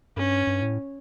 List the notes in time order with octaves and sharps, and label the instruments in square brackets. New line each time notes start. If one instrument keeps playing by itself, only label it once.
[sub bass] G2 [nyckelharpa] C#4
[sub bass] G2
A2